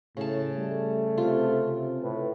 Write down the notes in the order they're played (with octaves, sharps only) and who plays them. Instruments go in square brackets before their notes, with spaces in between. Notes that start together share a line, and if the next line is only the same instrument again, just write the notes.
[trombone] A2 [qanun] C#3 A5
[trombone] G3 [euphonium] A3
[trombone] C3 [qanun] F4
[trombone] C3
[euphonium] A2 [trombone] B4